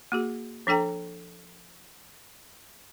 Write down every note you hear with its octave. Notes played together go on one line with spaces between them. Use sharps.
A#3 F#4 G#4
F3 D4 A4 G5 A#5